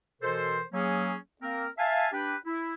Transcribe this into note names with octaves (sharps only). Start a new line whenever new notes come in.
B2 E3 A4 A#4 C5
F#3 A#3 C#4 G#4
A#3 C4 A#4
E5 F5 G#5 A5
D4 G4 B4 G5
E4